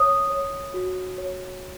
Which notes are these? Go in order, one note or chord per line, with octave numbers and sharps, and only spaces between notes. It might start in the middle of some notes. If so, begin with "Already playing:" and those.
Already playing: C#5 D#6
C#5
F#4
C#5